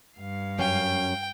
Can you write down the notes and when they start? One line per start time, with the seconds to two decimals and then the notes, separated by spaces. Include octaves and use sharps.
0.17 G2 F5
0.59 F#2 C#4 G5